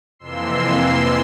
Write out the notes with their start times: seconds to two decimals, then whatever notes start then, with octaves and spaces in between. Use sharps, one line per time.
0.19 F2 C3 E3 A#3 C6 E6